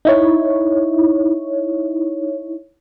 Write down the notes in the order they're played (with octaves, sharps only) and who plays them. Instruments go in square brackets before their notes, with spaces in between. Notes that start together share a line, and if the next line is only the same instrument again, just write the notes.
[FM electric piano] D#4 E4 C#5